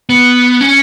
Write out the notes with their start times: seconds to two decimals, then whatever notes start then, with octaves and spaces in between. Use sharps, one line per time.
0.09 B3
0.61 C#4